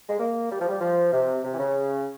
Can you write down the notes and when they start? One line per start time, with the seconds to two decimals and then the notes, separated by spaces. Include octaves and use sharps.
0.09 G#3
0.19 A#3
0.50 G3
0.60 F3
0.69 G3
0.81 F3
1.12 C3
1.44 C3
1.52 E3
1.59 C#3